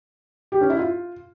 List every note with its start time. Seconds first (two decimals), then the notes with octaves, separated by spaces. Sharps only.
0.52 G4
0.61 C#4
0.70 E4
0.79 F4